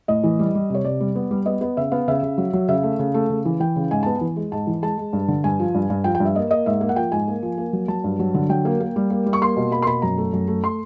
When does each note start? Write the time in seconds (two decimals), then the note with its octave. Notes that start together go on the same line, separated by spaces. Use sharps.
0.08 A2 D#5
0.24 E3
0.39 G3
0.55 G3
0.70 C3 C#5
0.84 C3 D5
1.00 G3
1.15 B3
1.31 G3
1.46 B3 D#5
1.61 B3 D#5
1.77 C#3 E5
1.92 B3 F5
2.08 C#3 E5
2.23 C#3
2.38 F#3
2.53 F#3
2.68 C#3 E5
2.83 A3
2.99 C#3
3.14 A3
3.30 C#3
3.45 E3
3.60 E3 G5
3.76 C#3
3.91 G#2 G#5
4.03 B3 A5
4.16 G#5
4.21 E3
4.36 G#3
4.52 G#2 A5
4.67 E3
4.82 G#3 A5
4.97 G#3
5.13 G2
5.28 D3
5.44 G2 G#5
5.59 F3
5.74 G2
5.90 G2
6.04 F3 G5
6.15 G5
6.20 G2
6.25 E5
6.35 A#3 D#5
6.51 A#3 D#5
6.66 G#2 E5
6.81 A#3
6.89 F#5
6.96 F3 G5
7.12 G#2 G#5
7.28 A#3
7.43 F3
7.58 A#3
7.73 F#3
7.88 F#3 A5
8.04 G2
8.19 F#3
8.34 D3
8.49 F#3 G5
8.65 A#3
8.80 A#3
8.96 G3
9.10 A#3
9.26 G3
9.33 C#6
9.42 A#3 C6
9.57 B2
9.71 A#3 B5
9.82 C6
9.87 B2 B5
10.02 F#2 A#5
10.18 A3
10.33 F#2
10.48 A3
10.64 C6